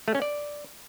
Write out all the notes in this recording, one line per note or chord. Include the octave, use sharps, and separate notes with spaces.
A3
C#4
D5